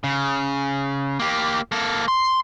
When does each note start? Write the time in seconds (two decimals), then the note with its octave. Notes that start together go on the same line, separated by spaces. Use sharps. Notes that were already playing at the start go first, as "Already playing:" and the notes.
0.04 C#3
1.19 A#3 G4
1.72 A#3 A4
2.08 C6